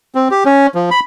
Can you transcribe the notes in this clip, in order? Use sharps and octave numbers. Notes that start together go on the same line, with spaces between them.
C4
G4
C#4
F3
B5